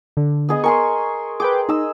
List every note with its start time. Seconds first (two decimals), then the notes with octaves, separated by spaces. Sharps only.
0.17 D3
0.49 B3 G#4 D#5
0.64 A#4 G#5 C6 C#6
1.40 G#4 B4 G5 D6
1.69 D#4 D#5 E6